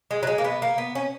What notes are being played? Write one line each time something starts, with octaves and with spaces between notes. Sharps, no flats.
G#3
F#3
G#3
A#3
B3
A#3
B3
C#4